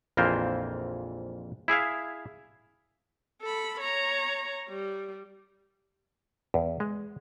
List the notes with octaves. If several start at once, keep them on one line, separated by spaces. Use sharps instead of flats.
A#1 F2 E3 F4 A#4 C5
E4 G#4 E5 F5
A4 B5
C#5 A#5
G3
E2
G#3